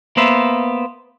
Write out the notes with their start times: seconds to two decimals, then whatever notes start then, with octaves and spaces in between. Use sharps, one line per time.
0.17 A#3 B3 C5 E5